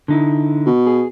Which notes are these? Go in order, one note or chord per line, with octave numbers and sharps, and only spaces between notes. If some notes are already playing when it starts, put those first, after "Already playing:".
D3 D#4 E4
B2
G#4